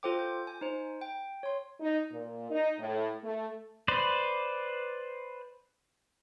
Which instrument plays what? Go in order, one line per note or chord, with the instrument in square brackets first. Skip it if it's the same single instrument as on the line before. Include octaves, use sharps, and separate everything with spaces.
[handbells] F4 A4 C5 G5 D6
G6
G#5
D#4 C5
G5
C#5 C6
[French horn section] D#4
A#2
D#4
A2
A3
[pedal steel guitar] B4 C5 D5